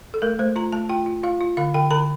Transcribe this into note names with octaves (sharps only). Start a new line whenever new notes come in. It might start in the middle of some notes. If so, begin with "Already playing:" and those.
A4
A3 A#4
A3 C5
F4 A#5
A3 A5
F4 G5
F4
F4 F5
F4
D3 F5
D3 G5
D3 A#5